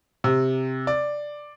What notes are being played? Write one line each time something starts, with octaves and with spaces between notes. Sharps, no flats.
C3
D5